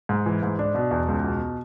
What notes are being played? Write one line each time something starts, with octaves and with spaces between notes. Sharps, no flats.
G#2
E3
G#2
D4
B2
E2
C#2
B2